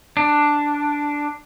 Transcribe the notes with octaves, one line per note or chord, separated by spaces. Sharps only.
D4